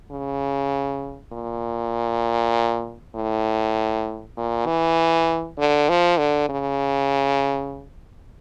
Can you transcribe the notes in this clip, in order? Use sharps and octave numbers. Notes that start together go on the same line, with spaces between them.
C#3
A#2
A2
A#2
E3
D3
F3
D3
C#3